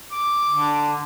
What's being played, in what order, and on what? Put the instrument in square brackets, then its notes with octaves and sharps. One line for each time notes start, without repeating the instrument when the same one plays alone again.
[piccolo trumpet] D6
[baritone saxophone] D3